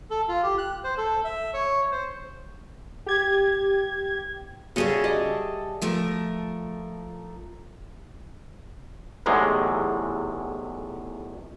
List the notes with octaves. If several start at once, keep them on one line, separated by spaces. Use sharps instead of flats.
A4
F4
G4
F#6
C5
A4
E5
C#5
C5
G4 G#6
C#3 G3 F#4 G#4 A4 E5
D5 D#5
F3 A3 A#4
B1 E2 A2 C3 G#3